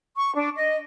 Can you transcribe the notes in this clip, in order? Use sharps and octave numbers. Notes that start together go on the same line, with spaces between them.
C#6
D4
D#5